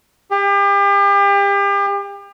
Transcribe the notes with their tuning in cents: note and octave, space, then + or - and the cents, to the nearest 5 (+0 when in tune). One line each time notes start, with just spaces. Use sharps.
G4 +35